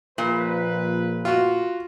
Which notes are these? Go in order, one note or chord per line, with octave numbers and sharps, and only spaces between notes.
A#1 A#2 B4
F4 F#4